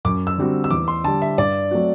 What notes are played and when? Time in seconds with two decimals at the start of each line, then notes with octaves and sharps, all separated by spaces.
0.05 F#2 D6
0.27 E6
0.38 D3 G3 C4 F#4
0.64 E6
0.71 E2 D6
0.88 C6
1.04 D3 A5
1.08 G3
1.22 E5
1.38 G2 D5
1.71 F#3 A3 C4 F#4